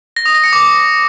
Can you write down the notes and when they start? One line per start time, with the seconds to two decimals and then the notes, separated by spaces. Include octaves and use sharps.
0.17 A#6
0.26 D#6
0.35 A#6
0.44 C#7
0.53 D6